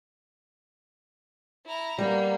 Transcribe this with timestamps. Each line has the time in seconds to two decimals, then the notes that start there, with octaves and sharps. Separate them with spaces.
1.65 E4 A#5
1.98 G3 A#3 B3